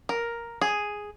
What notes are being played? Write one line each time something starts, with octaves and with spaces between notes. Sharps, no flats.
A#4
G#4